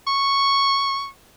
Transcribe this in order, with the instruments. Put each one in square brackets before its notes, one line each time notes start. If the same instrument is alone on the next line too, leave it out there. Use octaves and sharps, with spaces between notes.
[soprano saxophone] C#6